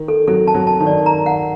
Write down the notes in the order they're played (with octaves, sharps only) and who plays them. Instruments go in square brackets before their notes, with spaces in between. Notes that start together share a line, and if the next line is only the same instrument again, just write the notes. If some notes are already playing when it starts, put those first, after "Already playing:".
Already playing: [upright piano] D#3
[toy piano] A4
[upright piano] F#3 [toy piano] A4
[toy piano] A5
[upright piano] F#3
[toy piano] A5
[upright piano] D#3
[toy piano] D5
A#5
F#5